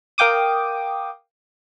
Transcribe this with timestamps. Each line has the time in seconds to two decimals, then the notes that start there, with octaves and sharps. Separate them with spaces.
0.18 A#4 F5 G5 D6 D#6